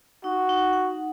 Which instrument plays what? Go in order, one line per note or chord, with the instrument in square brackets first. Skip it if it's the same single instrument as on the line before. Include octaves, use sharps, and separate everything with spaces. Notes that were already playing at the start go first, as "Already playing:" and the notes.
[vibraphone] D#4 [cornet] F#4
[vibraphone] D#4
F#5